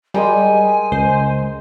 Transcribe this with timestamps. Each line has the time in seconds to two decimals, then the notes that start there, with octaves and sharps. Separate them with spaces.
0.14 G3 G#3 A#4 G5 G#5
0.92 C#2 C5